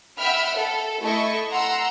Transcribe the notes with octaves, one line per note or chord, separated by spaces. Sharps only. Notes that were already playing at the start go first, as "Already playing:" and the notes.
E5 F#5 G5 B5 F6
A4
A3 E4 A4 D#5 C#6
F#5 A#5 C6 E6